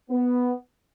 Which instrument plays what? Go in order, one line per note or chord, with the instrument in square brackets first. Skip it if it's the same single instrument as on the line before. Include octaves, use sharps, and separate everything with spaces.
[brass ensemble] B3